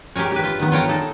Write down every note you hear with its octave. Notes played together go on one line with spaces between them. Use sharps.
G4 G#4 A#4 C#5
G4 B4
F4
D#3 B3
F4 C#5 G5 A#5
D#4 A4